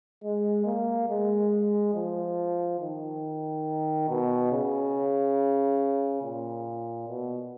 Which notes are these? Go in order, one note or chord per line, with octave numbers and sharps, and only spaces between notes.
G#3
A#3
G#3
F3
D#3
B2
C#3
A#2
B2